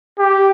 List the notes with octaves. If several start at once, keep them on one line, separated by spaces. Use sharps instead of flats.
G4